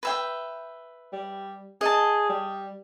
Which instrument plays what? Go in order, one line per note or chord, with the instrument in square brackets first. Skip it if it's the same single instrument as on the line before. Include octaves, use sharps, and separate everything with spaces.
[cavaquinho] B4 E5 G5
[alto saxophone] G3
[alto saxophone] G#4 [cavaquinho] D#5 A5
[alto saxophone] G3